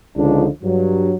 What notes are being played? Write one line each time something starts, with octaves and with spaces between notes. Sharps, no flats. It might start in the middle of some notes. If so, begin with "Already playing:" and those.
C#2 D3 F3 D4 D#4
G2 F#3